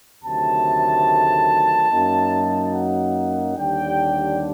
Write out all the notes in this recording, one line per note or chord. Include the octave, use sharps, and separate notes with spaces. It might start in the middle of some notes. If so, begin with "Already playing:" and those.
D2 C3 D#3 F#3 A3 A5
F#2 F#3 A#3 D#4
F#5
D#2 D3 G3 D4 G5